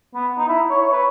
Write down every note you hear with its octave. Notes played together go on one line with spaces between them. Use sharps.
B3
D#4
E4
C#5
C#5
B4